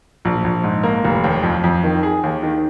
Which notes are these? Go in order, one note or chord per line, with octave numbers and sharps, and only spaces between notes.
A#1
A#1
G#2
A#3
F1
D#2
F2
F2
D#3
G#4
D#2
D#3